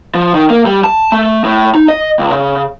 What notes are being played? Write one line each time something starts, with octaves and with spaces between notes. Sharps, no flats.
F3
D#3
A#3
G3
A5
A3
A2
D#4
D#5
C#2
C#3